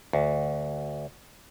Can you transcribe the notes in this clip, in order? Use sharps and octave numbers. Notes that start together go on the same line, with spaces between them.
D2